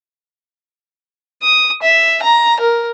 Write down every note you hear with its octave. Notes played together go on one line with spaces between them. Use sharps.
D#6
E5
A#5
A#4